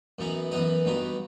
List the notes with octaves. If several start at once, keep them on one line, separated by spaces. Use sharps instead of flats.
F#2 E3 B3 D#4
F#2 E3 B3 D#4 D#5
G2 F#3 B3 D#4